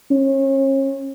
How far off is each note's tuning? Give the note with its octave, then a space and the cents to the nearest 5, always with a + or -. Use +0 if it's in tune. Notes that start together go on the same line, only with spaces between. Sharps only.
C#4 -35